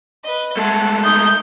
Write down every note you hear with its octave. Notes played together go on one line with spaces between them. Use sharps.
B4 D#5
G#3 A3 A4 F#5
D#4 A#4 D#6 G6